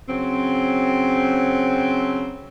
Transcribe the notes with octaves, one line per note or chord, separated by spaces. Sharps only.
C#3 F#3 C4